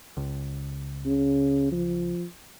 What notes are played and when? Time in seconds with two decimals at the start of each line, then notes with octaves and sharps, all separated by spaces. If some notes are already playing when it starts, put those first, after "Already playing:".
0.17 C#2
1.05 C#3
1.72 F3